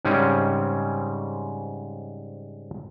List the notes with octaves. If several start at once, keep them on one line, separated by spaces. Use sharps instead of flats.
G#2 C#3 G3 C4 C#4